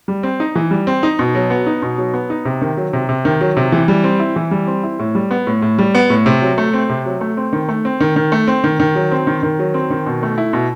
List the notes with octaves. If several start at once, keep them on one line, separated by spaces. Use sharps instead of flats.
G3
C4
D#4
E3
G3
C4
D#4
B2
F#3
B3
D#4
B2
F#3
B3
D#4
C3
D#3
F#3
C3
C3
D#3
F#3
C3
E3
G3
C4
E4
E3
G3
C4
E4
A2
G3
B3
A2
A2
G3
B3
A2
C3
F#3
A3
C4
C3
F#3
A3
C4
D#3
A3
C4
D#3
D#3
A3
C4
D#3
D#3
F#3
C4
D#3
D#3
F#3
C4
D#3
B2
A3
E4
B2